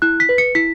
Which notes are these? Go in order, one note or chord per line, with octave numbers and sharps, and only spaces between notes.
E4 F#6
B6
B4
C#7
E4 B6